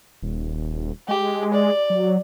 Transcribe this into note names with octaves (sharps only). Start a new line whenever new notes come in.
D#1
G#3 G4
D5
F#3